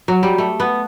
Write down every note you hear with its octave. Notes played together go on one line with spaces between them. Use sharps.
F#3
G3
A3
B3